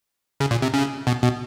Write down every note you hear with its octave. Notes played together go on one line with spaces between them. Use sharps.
C#3
A#2
C3
C#3
B2
B2